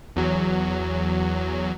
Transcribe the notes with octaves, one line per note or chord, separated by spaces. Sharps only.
E2 F#3